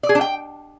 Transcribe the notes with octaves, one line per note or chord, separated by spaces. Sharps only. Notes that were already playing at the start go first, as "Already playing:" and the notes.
D5
G#4
D4
G5